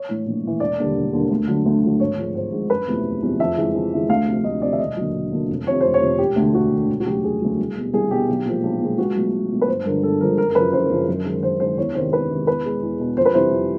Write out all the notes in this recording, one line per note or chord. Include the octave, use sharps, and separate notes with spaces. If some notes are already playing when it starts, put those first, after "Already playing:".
Already playing: C#5
A2 E3
A#1
A2 E3
E1 D5
D#2 D3 G3
E1
D#2 D3 G3
D2
D3 F#3
D2
D3 F#3
G#1 C#5
G#2 F3 G#3
G#1 C5
G#2 F3 G#3
F#1 B4
E2 C3 F3 A3
F#1
E2 C3 F3 A3
F2 E5
C#3 E3 G#3
F2
C#3 E3 G#3
D2 F5
C3 F3
D2 D#5
C3 F3 D5
E5
E1 D#5
D#2 D3 F#3
E1
D#2 D3 F#3
F1
F2 C3 C#5
F1 C5
C#5
F2 C3
E1 G4
D2 D3
E1 F#4
D2 D3
E1
F#4
D2 C#3 F#3 G4
E1 G#4
D2 C#3 F#3
C2
B2 G3
C2 G#4
B2 G3 G4
B1
A#2 F3 G#3
B1
A#2 F3 G#3
C#2 F#4
B2 F#3 A3
C#2
B2 F#3 A3
B4
G1 C5
G2 D3 F3 G#3 A#4
G1 A4
G2 D3 F3 G#3 A#4
F#1 A#4
A#4
F#2 C#3 F3 B4
F#1 C5
F#2 C#3 F3
F#2
D#3 G#3
F#2 C5
D#3 G#3 C5
E2 C#5
C3 D#3 G#3 C5
E2 B4
C3 D#3 G#3
E2 B4
B2 G#3
E2
B2 G#3
F2 C5
B4
C3 E3 G3 C5
F2